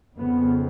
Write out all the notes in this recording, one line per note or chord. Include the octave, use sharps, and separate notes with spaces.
F2 C#3 B3